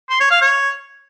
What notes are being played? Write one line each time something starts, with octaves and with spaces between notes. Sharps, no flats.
C6
C#5
F5
C#5